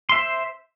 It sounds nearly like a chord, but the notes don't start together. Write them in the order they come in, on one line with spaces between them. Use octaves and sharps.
C6 E5 C5